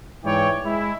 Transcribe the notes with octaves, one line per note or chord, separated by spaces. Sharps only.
G#2 E3 E4 C#5 D5 G5
G#3 E4